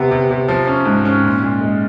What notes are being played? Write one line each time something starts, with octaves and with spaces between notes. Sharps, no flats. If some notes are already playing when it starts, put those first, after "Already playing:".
Already playing: C3 B3
C3
C3
F3
C#4
G#2
C#4
A#2
A#2
G#3